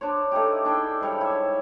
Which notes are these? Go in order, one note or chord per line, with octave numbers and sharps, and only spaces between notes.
D4 C5 C#5
A3 D#4 E4 G4
D4 E4 G#4 G5
G#2 G3 C#5
E4 E5